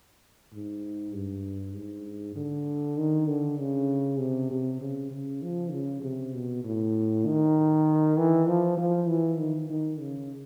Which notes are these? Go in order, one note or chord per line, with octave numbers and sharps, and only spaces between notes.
G#2
G2
G#2
D3
D#3
D3
C#3
C3
C3
C#3
C#3
F3
C#3
C3
B2
A2
D#3
E3
F3
F3
E3
D#3
D#3
C#3